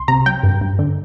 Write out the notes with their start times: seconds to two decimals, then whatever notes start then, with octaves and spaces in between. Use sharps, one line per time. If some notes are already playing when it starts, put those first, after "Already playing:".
Already playing: C2 C6
0.08 C3 A#5
0.26 F#3 G5
0.43 G2
0.61 G2
0.79 D3